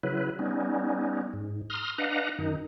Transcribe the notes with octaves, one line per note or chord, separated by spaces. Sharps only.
C#3 F#3 E4 B4
G3 B3 C#4 D#4
G#2
A#5 C6 D#6 F6
D4 B4 D#5 F5 F#5 A#5
F#2 D#3 D#4